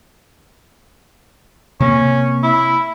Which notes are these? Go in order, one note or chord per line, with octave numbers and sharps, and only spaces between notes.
C3 A#3 C#4
E4